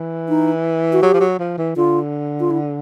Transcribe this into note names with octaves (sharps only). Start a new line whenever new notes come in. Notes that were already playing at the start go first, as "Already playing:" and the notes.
Already playing: E3
D#4
F#4
F#3 G4
F3
F#3
F3
E3
D3 F4
F4
E4